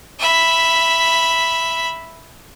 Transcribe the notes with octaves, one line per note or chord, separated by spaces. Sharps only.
E5 B5